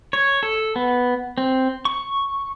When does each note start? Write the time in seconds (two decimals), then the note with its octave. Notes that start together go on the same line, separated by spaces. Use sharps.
0.13 C#5
0.43 A4
0.76 B3
1.38 C4
1.85 C#6